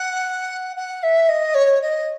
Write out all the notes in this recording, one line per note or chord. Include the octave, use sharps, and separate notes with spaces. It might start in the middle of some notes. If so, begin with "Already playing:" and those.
Already playing: F#5
F#5
E5
D#5
C#5
D#5